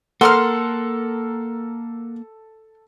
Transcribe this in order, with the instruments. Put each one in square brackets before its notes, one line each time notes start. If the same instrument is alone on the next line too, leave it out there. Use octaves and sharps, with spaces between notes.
[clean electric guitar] A#3 [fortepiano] A4 [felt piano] A#4 F#5 [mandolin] C6 D6 F6